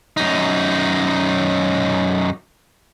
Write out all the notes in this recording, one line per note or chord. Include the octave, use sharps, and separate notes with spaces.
F#2 D#4